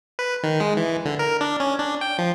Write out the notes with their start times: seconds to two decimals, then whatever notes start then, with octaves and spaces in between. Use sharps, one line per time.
0.19 B4
0.43 D#3
0.60 G#3
0.77 E3
1.05 D3
1.19 A#4
1.41 D4
1.60 C#4
1.79 D4
2.01 G5
2.19 F3